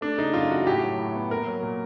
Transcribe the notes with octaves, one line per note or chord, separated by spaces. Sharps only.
A3 D4
C#3 D#4
F#2 F4
E3 F#4
A2 G4
F#3
A2
B3
A#2 A#4
F#3
A#2